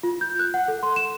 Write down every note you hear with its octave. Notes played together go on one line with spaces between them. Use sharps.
F4
G6
F#6
F#5
A4
C6
E7